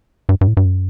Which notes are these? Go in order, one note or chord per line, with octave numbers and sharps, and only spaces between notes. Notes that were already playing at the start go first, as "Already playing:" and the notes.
G2
G2
A2
G2
F#2